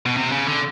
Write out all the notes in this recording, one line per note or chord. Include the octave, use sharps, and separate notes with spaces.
B2
C3
C#3
D3